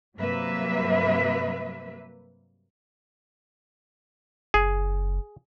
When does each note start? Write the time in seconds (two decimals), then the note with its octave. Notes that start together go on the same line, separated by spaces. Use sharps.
0.17 G2 C3 F#3 A#3 B4 E5
4.54 F#1 G#4